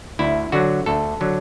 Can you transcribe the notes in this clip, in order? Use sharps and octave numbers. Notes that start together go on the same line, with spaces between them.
D2 E4
D3 F#3 F#4
D2 A4
D3 F#3